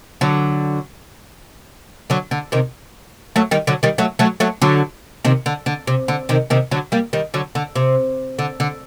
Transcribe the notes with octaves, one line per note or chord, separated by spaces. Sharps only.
D3 F#3
D3 F#3
D3
C3 D#3
F#3 A3
D#3 G3
D3 F#3
D#3 G3
F#3 A3
F#3 A3
F#3 A3
D3 F#3
C3 D#3
D3
D3
C3
D3
C3 D#3
C3 D#3
D3 F#3
G3 A#3
D#3 G3
D3 F#3
D3
C3
D3
D3